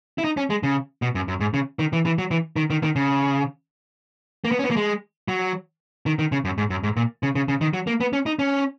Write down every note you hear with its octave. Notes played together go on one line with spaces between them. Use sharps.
E4
D#4
C#4
G#3
C#3
B2
F#2
F#2
G#2
C#3
D#3
E3
E3
F#3
E3
D#3
D#3
D#3
C#3
A#3
B3
C#4
B3
A#3
G#3
F#3
D#3
D#3
C#3
F#2
G#2
F#2
G#2
A#2
C#3
C#3
C#3
D#3
F#3
A#3
B3
C#4
D#4
C#4